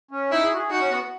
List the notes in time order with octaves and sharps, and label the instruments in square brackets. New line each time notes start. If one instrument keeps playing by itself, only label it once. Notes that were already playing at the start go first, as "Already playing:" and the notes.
[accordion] C#4
[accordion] D#4 [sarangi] E4
[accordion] G#4
F#4
G#4
[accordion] D#4 [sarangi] F#4
[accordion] C#4
B3
A3